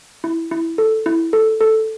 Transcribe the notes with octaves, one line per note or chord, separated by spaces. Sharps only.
E4
E4
A4
E4
A4
A4